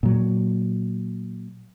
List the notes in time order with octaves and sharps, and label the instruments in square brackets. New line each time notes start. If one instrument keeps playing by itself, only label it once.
[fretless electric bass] A#2 F#3